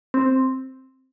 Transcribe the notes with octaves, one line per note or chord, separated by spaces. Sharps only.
C4